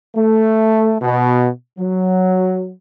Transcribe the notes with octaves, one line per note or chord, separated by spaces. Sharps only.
A3
B2
F#3